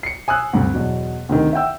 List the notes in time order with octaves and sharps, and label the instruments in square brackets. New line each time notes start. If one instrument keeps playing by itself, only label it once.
[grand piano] C7 C#7
G#5 D#6 E6 F#6
D2 G2 C3
E2 B2 F#3
D2 C3 D#3
E5 F#5 G5 E6